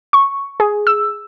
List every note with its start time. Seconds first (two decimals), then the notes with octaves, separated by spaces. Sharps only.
0.13 C#6
0.60 G#4
0.87 E6